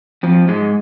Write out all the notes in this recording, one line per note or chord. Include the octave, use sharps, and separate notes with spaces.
F2 F3
G#2 G#3